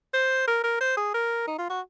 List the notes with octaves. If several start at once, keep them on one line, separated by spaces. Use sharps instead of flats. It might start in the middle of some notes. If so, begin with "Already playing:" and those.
C5
A#4
A#4
C5
G#4
A#4
D#4
F4
F#4